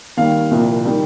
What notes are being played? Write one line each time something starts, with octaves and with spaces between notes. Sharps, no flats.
D#2 D#3 G3 F5
C2 A#2 F3
D#3 G3